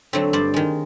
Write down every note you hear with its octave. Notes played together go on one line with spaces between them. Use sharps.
D3 F#3 A3 C4
G2 C5 D5
D#3 G#3